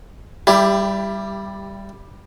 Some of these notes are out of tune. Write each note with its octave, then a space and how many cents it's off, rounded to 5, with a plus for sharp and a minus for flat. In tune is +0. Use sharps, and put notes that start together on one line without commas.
G3 +0 E4 +30 G4 +15